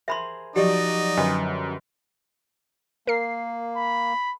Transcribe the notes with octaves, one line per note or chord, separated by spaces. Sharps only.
G#4 A#4 C5 E5 B5 C6
F3 F#3 D#4 F#4 G4 D5 D#5
F#2 D3 D4 G4 B4 D#5 A5
A#3 A#4 C7
B5